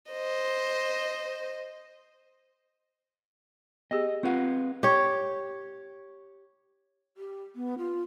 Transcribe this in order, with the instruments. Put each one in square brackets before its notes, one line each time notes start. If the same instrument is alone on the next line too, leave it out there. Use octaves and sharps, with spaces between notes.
[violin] C5 D#5
[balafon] B3 G4 G#4 [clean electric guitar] D#5
[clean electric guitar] C4 B4 F5 [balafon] F4 F#5
[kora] G4 C#5
[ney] G4
B3
F4